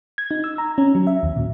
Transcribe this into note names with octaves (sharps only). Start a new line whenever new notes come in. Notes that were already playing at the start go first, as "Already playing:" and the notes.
G#6
D#4
E6
A#5
C#4
F#3
E5
D#2
A#2